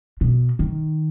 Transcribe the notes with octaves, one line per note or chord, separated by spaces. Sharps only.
B2
D#3